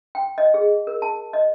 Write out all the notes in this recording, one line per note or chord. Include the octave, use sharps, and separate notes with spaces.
G5
D#5
G#4
A#4
A5
D#5